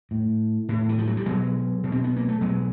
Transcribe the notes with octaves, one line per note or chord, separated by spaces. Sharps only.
A2
A2
E3
F3
F#3
G3
B2 F#3 G#3
B2
C4
B3
A#3
A3
B2 F#3 G#3